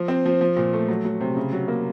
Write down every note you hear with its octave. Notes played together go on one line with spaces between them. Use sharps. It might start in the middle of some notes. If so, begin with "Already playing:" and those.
Already playing: F3
C4
F3
F3
A#2
A3
F#3
F#3
C3
C#3
F#3
A#3